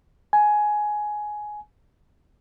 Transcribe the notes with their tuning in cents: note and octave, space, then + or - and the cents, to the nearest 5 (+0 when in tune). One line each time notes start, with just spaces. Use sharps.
G#5 +15